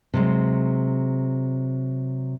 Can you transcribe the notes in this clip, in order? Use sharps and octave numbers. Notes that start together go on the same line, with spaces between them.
C3 F#3 G#3